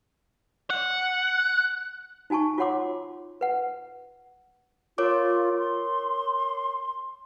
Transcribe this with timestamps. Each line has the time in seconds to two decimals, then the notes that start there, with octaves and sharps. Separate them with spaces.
0.70 F#5
2.30 D#4 F#4 G#5 A5 C#6
2.58 F4 F#4 C#5 F#5 C6 D6
3.41 B4 F#5
4.98 F4 A#4 C#5 D6
5.59 C6